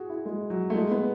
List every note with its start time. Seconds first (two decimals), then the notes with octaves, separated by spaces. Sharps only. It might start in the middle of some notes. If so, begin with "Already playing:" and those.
Already playing: F#4 G#4
0.09 E4
0.26 G#3
0.50 F#3
0.70 A3
0.75 G#3
0.91 B3